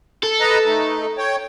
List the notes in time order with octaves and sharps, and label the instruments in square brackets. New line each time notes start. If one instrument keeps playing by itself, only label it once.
[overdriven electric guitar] A4
[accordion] B4 D#5 A#5
A3 D#4
C#5 G5